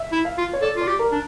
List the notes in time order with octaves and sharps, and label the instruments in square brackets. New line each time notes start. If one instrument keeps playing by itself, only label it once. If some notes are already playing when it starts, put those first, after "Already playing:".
Already playing: [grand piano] E5
[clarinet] E4
[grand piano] F5
[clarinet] F4
[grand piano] C#5
[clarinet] A4 [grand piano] D5
[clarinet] F4 [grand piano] D5
[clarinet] G4
[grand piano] A#4
[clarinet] D4